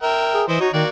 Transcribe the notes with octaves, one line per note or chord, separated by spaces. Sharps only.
A#4 E5 G5
G#4
E3 E4 C5 D#5
D#4 F#4 C#5
D#3 A#3 F#4 D5